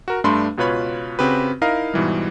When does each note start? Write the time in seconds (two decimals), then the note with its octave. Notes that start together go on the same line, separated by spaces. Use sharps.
0.08 F#4 A#4
0.24 G2 A3 D4 B5 C6
0.57 C#2 B2 F4 B4 C#5 B5
1.19 C#3 C4 F#4 G4 B4
1.61 D#4 E4 A#4 D#5 F5
1.94 G#2 B2 E3 G3